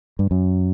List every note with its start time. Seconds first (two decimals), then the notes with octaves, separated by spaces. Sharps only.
0.19 G2
0.31 F#2